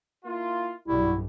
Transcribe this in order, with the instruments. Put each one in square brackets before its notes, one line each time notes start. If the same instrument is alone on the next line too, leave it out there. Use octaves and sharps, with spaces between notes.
[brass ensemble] A#3 E4 F4
[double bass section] B1 G2 [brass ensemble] G3 F#4 [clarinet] E4